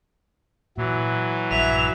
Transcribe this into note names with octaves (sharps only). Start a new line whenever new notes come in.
A#2 E3 F#3
A#1 G2 E5 F7